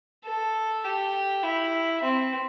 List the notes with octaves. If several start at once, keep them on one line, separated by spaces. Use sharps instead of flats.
A4
G4
E4
C4